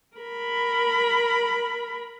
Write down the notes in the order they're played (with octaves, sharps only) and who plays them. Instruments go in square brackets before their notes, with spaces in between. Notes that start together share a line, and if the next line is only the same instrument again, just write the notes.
[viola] A#4 B5